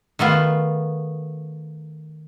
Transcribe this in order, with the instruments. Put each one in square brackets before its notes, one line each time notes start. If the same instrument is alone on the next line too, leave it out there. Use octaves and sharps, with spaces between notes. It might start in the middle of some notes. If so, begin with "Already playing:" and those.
[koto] D#3 A3 B3 F4